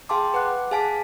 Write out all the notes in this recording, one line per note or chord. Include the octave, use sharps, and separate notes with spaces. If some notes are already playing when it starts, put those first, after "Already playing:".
G#4 F5 G5 A5 C6 D6
B4 F#5 D6 F#6
G#4 F5 G#5 A5 B6 D7